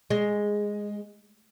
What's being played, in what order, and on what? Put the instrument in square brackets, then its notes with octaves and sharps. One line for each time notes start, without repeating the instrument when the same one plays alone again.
[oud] G#3